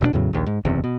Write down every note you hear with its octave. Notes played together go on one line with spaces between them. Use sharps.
E1 B2 A#3 D4
E2 A2 C#3 F#3
A#1 D#2
G#2
F#1 E2 C3
B2